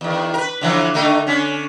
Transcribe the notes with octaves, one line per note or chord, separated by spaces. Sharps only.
E2 D#3
A#4 B4
D3 E3 F3
D3 A3 D#4
D3 C#4